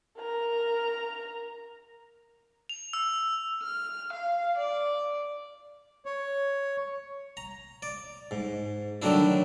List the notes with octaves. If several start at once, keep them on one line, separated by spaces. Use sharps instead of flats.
A#4 A#5
F7
E6
F6
F5
D5
C#5
A#5
D5
G#2
D3 D#3 F#3 A3 D4 E4